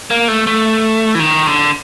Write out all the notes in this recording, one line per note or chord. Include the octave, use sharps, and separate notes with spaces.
A#3
A3
A3
E3
D#3
D3